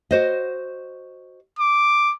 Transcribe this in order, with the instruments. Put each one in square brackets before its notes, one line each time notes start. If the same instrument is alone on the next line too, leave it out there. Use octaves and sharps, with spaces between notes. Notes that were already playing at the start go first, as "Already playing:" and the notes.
[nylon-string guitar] F#4 C5 D#5
[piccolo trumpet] D6